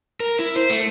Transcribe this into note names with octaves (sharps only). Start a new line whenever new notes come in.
A#4
E4
C5
A3